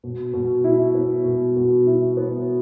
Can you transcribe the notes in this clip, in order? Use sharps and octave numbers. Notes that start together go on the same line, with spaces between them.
B2
B2
E4
B3
B2
B2
E4
B3